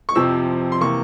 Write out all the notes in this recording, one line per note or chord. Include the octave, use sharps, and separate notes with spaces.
C#6
F2 C3 F3 C4 E6
C6
C3 E3 A#3 C#6